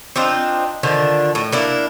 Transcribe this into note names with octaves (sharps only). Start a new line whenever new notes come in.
C4 D4 D#4 F4
D3 D#3 F3 D4
A2
A#3 D4 E4